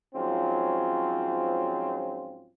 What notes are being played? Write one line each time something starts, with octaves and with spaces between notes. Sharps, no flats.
G#2 F3 F#3 C4 C#4 F4